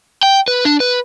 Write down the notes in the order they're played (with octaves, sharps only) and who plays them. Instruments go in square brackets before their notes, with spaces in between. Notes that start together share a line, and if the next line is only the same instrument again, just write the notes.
[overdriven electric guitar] G5
B4
D4
B4